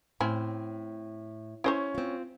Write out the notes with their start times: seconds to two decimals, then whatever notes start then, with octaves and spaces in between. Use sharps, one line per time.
0.20 A2 C4 C#4 E4
1.64 C#4 E4 C5 C#5
1.95 C4 F4